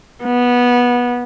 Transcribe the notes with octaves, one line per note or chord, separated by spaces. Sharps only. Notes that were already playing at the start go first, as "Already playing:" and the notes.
B3